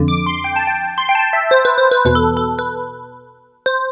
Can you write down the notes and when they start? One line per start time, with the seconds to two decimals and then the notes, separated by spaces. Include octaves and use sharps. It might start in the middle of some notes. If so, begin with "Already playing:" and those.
Already playing: F2 D3
0.08 D6
0.26 C6
0.44 G5
0.56 A5
0.67 G5
0.98 C6
1.09 G5
1.15 A5
1.33 E5
1.51 C5
1.65 B4
1.78 C5
1.91 B4
2.05 E2 B2 B4
2.15 A4
2.37 A4
2.59 B4
3.66 C5